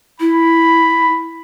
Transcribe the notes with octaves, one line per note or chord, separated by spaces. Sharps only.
E4 B5